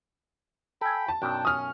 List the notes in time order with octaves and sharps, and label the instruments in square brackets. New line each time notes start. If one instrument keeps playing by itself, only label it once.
[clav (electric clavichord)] A4 G#5 [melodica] G5 B5
[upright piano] A5
[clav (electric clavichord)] B1 F#2 [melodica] D4 G5
[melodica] C#4 [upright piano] D#6 F6